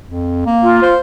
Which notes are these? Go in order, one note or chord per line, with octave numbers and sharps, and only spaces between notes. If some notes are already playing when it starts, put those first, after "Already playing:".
F2
A#3
F4
C5